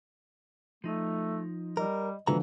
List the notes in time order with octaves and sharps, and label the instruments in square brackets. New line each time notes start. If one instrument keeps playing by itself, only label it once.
[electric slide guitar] F3 D#4 [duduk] A3
[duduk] G3 [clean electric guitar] A#4 [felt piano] D#5
[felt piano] D3 F3 [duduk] E3 [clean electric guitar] G#3 F#4 A#5